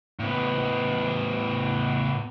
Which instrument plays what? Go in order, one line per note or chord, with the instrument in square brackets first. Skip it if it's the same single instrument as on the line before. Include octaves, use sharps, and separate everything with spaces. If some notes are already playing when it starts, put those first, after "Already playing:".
[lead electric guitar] A2 B3